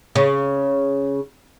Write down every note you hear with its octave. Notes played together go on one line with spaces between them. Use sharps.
C#3